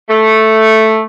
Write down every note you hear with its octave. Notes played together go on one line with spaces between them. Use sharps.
A3